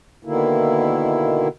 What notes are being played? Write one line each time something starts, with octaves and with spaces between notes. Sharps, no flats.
B2 D3 D#3 A#3 E4